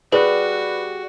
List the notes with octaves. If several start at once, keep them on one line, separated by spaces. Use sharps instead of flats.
G3 F#4 G#4 B4